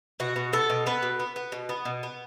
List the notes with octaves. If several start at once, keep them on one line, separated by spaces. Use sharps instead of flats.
B2 F#4
B2
B3 A4
B2
B3 B4
B2
B3
B3
B2
B3
B2
B3